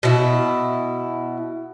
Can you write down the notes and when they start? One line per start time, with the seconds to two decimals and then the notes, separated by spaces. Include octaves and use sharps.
0.03 B2 E4